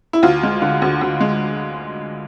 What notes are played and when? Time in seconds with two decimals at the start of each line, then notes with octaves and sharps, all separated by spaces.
0.13 E4
0.23 D2 F4
0.43 G#3
0.62 D3
0.82 D2
1.01 D2
1.21 G#3